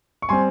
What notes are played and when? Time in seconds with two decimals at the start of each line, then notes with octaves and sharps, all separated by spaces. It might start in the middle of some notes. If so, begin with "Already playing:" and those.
0.22 C#6
0.29 G3 C4 G#5 C6